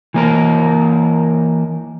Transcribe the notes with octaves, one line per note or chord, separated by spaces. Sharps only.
E3 A#3 A#4